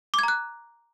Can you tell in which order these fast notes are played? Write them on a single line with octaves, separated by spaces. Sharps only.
D6 G#6 A#5 F#6